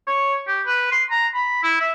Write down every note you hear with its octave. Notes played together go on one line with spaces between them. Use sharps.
C#5
G4
B4
C6
A#5
B5
E4
E5